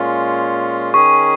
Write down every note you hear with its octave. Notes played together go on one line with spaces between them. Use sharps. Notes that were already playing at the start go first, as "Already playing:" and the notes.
Already playing: A#2 G#3 C#4 F4
D#3 C#4 G#4 C#6